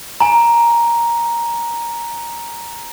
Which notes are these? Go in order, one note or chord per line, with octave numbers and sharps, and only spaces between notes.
G#5 A#5